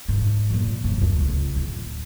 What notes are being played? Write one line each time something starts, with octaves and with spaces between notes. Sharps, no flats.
G#2
F2 A#2
F#2
D2
C#2
D1